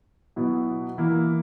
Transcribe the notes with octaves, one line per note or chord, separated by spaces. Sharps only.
B2 F#3 B3 E4
E3 A#3 E4